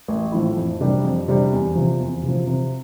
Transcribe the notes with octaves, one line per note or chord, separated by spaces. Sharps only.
A1
A2 F3 A3 E4
F2
C3 G3 D4 G4
F2
C3 G3 D4 G4
E2
C3 F3
E2
C3 F3
C3